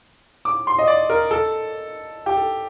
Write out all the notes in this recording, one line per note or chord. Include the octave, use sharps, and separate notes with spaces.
D6
C6
D#5
D5
A#4
A4
G4
A4